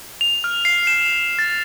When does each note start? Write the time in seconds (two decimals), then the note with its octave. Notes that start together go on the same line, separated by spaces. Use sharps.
0.21 F7
0.44 F6
0.65 C7
0.87 E7
1.39 A6